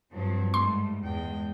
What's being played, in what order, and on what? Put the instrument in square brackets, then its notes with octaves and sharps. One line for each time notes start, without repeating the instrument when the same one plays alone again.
[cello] G2 [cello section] F3 F#3 C4
[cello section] G#2 G3 A3 [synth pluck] C6
[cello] E2 G5 [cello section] G#3